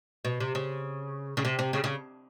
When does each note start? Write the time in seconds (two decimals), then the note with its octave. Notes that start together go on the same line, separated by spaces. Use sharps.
0.25 B2
0.40 C3
0.55 C#3
1.37 C#3
1.45 C3
1.59 C3
1.73 C#3
1.84 C#3